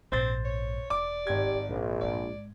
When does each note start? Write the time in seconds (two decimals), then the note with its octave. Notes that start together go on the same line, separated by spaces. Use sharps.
0.12 A#1 G#2 C4 C5 A6
0.45 C#5
0.90 E1 D5 D6
1.27 G#1 G4 G#6
1.69 A#1 D3 D#3
2.01 G#2 G#3 D5